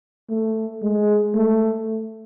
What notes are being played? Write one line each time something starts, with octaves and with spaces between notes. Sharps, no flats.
A3
G#3
A3